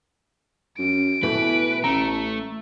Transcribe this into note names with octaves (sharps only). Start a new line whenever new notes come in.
F#2 D7
B2 E3 A3 B4
A1 A3 A#5